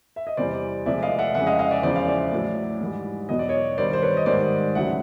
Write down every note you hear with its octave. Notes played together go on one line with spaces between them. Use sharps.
E5
D#5
E2 C3 E3 G3 C5 D5
D2 C3 F3 G#3 D5 E5
D#5 F5
E5 F#5
F2 C#3 E3 G#3 E5 F#5
D#5 F5
D#5 F5
D5 E5
E2 C#3 F3 G#3 C5 D5
F5
D5 E5
A2 F#3
G#2 E3 G3
E2 B2 F#3 D#5
D5
C#5 D#5
G2 D#3 G3 C5 D5
C5
B4 C#5
D#5
G#2 D#3 G3 C5 D5
D2 C#3 F#3 E5 F#5